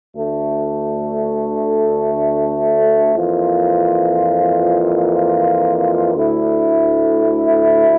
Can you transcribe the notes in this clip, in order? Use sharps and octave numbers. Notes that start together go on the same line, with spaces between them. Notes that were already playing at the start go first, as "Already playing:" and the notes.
D2 D3 A3
F2 E3 A#3 F4 C5
D2 D3 A3 E4